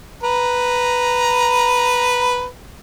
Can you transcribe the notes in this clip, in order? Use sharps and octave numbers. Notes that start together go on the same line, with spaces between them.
B4 A#5